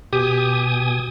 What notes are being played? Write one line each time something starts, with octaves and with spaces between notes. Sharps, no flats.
B2 G4 G#5 D#6